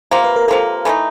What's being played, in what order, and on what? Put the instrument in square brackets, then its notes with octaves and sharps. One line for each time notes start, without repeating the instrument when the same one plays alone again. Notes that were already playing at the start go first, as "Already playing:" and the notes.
[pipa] C3 F3 A#3 [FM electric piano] C5
[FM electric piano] B4
A#4
[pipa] C3 F3 A#3 [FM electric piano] A4
[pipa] E3 A3 C4 D#4 [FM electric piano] A4